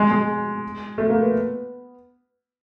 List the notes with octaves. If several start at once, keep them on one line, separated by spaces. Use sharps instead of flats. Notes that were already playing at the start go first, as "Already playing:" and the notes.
Already playing: G#3
G#3
A3
A#3
B3